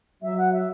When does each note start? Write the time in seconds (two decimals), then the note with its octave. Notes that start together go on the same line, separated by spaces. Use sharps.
0.22 F#3 E5
0.37 F#5
0.53 E5